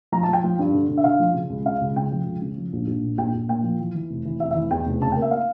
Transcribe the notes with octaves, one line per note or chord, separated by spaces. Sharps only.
F3 A#5
A5
F3 G5
F3
G2
D3
D3
E5
D3 F5
F3
C#3
C#2
C#3 F5
C#2
C#3 G5
F3
C#2
C#3
F3
A#1
A#1
A#2
A#1 G5
A#1
A#2 G5
F3
E3
E3
F1
E3
F1 E5
E5
E3
E2 G5
F1
C#3 A5
G5
A#3
E5
F5